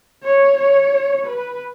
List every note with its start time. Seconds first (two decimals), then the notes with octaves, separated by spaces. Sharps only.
0.23 C#5
0.58 C#5
1.26 B4